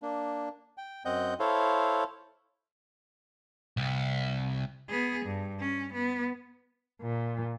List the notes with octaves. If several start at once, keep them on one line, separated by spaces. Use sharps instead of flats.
A#3 D4
G5
F#2 C4 D#5 F#5 G6
E4 A4 C5 C#5 F5
C2
B3 G#4
G2
C#4
B3
A#2